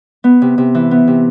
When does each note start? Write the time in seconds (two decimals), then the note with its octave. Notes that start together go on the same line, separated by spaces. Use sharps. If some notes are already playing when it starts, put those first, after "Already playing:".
0.24 B3
0.42 C3
0.58 C3
0.75 E3
0.91 B3
1.07 C3